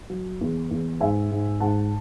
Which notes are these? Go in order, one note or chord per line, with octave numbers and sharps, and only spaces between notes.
F#3
E2
E2
G#2 E5 G#5
G#2
G#2 F#5 A5